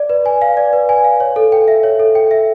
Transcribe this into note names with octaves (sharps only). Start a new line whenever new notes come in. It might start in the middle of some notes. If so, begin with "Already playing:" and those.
Already playing: D5
B4
G#5
F5
D5
B4
G#5
F5
C#5
A4
G5
E5
C#5
A4
G5
E5